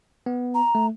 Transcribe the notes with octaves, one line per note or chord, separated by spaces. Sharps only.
B3
A#5
A3